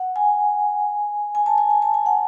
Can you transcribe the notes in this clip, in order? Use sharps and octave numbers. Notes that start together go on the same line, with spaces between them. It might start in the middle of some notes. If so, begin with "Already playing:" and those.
Already playing: F#5
G#5
G#5
A5
G#5
G#5
A5
G#5
F#5